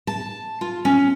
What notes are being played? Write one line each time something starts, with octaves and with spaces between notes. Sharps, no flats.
A5
F4
C#4